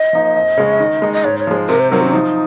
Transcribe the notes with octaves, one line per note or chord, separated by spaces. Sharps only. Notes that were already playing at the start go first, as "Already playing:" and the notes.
Already playing: D#5
F3 A#3 D#4
F2
C#3 G#3 C#4
D#3
G#3 D#4
D#5
G#2 C#5
C#5
F3 G#3
C3 A#4
C5
D#3 F#3 C4 A#4
C#4
F3 D#4